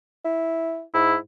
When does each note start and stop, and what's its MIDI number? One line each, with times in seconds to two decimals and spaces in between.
0.25 0.82 64
0.94 1.17 44
0.94 1.16 64